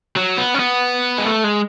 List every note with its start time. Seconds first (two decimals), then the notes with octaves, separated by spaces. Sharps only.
0.16 F#3
0.37 B3
0.54 C#4
0.59 B3
1.18 G#3
1.26 A3
1.44 G#3